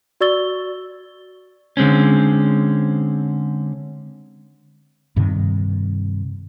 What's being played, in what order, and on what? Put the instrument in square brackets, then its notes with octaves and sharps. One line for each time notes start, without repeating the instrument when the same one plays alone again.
[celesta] F#4 D5 C#6 E6 A6 G7
[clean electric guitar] D3 G#3 C4 C#4
[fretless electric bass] G2 C3 D#3